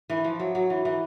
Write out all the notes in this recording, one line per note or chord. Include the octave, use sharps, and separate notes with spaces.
E3
F3
F#3
F#3
E3
E3